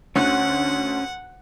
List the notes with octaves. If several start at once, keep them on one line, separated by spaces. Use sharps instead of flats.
D2 D3 C#4 F#5 F#6